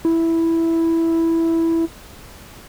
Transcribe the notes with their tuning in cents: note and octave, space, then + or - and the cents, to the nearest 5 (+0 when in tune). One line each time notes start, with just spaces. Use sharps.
E4 +0